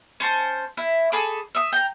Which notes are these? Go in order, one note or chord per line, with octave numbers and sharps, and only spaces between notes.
C#4 C5 A5
E4
G#4 A4 B5 D6
E5 D#6
G5 A#5